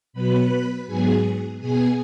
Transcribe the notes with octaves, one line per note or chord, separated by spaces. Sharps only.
B2 F#3 B3 B4 B5
G#2 F#3 B3 G#4 G#5
B2 B3 G#4 G#5